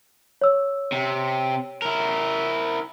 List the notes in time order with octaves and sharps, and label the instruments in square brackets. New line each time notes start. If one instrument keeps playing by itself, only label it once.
[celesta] C#5 E6
[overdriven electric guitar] C3
E4 A#4